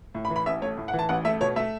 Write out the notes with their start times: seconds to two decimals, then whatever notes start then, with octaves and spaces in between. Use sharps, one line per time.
0.15 A2
0.25 B5
0.30 E3
0.36 B5
0.46 A1 E5
0.62 A3 C#5
0.77 A2
0.88 F#5
0.93 E3
0.99 A5
1.09 A1 F#5
1.25 A3 E5
1.41 B2 C#5
1.56 A3 E5